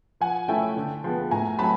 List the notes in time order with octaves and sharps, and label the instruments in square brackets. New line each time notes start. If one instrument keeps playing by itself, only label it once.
[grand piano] F3 F#5 G#5
A3 C#4 E4 G5 A5
D3
F3 G#3 B3
A2 G#5 A#5
F#3 A3 C4 A5 B5